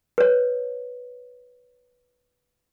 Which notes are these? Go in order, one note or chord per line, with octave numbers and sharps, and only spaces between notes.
B4 C#5